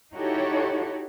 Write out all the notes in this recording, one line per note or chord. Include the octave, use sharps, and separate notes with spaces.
D#4 E4 F#4 G4 A4 C#5